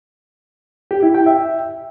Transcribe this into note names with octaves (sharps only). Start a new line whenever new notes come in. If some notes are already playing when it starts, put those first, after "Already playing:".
G4
E4
G5
E5